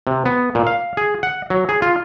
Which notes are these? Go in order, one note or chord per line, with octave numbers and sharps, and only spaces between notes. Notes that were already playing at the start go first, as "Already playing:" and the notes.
C3
B3
A#2
F5
G#4
F#5
F#3
G#4
F4